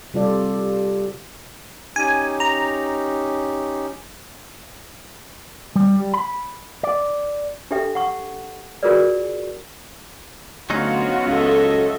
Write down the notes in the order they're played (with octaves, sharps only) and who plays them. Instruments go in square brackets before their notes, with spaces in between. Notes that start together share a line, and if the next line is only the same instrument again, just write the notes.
[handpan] C3 G3 F4 A4 D5
[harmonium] C#4 D#4 G4 [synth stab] G#5
[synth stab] A#5
[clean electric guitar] G3
G3
B5
D5
[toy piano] D4 G4 A4 E5 G5
F#5 C#6
F4 F#4 G#4 A#4 B4 D5
[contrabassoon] D2 [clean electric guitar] F#3 C#4 D#4 [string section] B3 F4 F#4
[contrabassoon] C#2 [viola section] A4 D#5 E5